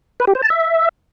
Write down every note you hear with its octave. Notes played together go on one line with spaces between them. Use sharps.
B4
G4
C5
A5
E5